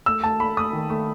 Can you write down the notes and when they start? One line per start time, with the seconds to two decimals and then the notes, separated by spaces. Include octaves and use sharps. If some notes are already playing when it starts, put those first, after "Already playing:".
0.06 A3 E6
0.24 A3 A5
0.40 A3 B5
0.57 A3 D#6
0.73 D#3
0.90 A3